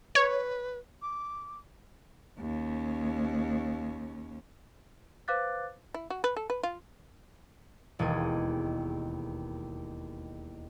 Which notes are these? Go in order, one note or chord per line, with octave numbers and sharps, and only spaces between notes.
B4 C#5
D6
D#2 C#4
B4 C5 F5 D6 F#6 A6
E4
F#4
B4
A4
B4
F4
E1 D#2 G#4 D#7